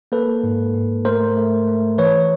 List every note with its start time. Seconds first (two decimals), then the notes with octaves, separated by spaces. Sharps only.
0.12 A#3 A4 B4
0.43 G#2
0.75 G#2
1.05 A3 A#4 C5
1.37 A3
1.67 A3
1.98 E3 B4 C#5